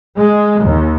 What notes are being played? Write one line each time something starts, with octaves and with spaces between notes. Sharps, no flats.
G#3
D#2